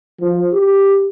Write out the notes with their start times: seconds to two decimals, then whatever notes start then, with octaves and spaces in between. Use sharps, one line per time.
0.21 F3
0.53 G4